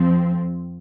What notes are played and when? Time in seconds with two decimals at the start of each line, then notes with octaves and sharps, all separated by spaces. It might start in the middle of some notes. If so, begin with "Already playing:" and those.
Already playing: F2 F3 C4